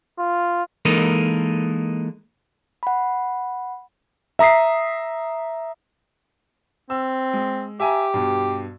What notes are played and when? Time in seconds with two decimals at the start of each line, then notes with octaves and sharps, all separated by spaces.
0.19 F4
0.85 E3 G#3 A#3 D#4 A4 A#4
2.83 F#5 B5
4.39 E5 A#5 D#6 B6 C7
6.90 C4 E6
7.33 G#3
7.80 G4 E5 G#5 A#5
8.14 G2 B2